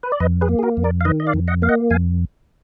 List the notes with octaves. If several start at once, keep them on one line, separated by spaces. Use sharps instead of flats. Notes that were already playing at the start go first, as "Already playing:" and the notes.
B4
D5
F2 B4 D#5
G#4 B4
A#3
G#4
F#4 A#4
F2
A#4 D5
F5
D#3 B4 D#5
D#5
D5 F5
F2
D#5 F#5
A#3 F5
D#5 F#5
F2 F5 G#5